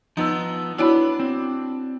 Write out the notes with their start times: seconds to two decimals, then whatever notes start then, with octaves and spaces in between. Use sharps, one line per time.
0.17 F3 B3 D#4 E6
0.78 B3 D4 E4 F#4 C#5 G5 B5
1.20 C4